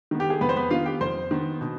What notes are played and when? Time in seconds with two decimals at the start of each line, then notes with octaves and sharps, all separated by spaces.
0.11 D#3 B3
0.20 G4
0.30 G#4
0.41 F2 B3 B4
0.49 C5
0.56 B3 B4
0.70 D#3 B3 F4 F5
0.86 G4 G5
1.01 F2 C5 C6
1.31 D#3 B3
1.61 B2